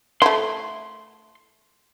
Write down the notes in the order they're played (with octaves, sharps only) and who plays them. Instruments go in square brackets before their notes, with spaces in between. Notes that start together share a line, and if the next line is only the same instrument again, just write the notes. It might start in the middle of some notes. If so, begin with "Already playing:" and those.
[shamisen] A3 E4 [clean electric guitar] C6